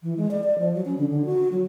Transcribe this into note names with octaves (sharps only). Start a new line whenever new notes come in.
E3
G#3
D5
D5
F3
F#3
C#4
D3
D3
F#4
F#3